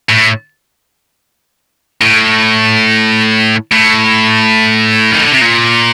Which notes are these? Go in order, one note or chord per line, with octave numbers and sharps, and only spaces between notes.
A2
A2
A2
D#3
D3
C3
A#2